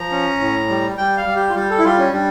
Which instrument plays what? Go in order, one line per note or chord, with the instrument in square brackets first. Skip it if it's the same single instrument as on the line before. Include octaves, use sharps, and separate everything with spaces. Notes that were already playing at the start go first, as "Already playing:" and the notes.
Already playing: [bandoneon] F3 [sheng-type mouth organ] A#5
[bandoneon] C#4
A2
G3
[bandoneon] G3 [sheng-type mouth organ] G5
[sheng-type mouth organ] F5
[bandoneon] G3
[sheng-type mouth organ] G4
F4
[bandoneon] G3 [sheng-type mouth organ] G4
[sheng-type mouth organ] A4
E4
[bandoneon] G3 [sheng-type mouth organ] F4
[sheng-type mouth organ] C#4
[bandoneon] G3 [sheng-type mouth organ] D4